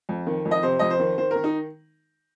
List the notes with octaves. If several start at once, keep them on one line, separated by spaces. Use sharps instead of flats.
F2
D#3
F2
D#5
C3 C5
F2 D#5
C5
D#3
D#3 C5
D#3 A#4
D#4